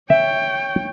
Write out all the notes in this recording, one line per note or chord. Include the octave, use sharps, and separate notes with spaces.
C#5 E5 G5